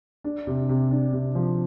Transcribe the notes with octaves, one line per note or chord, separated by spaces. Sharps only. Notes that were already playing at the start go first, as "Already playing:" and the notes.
D4
C3
C3
D4
C3
F3